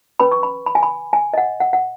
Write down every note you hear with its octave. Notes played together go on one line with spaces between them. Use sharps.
C#4 B4 B5
C#6
B5
B5
G#5
B5
G#5
D#5
F#5
F#5
F#5